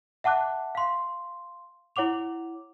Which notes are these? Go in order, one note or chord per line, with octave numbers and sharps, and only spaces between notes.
E5 F#5 A5 D6 F#6
F5 C6
E4 C#5 F#5 D6 F7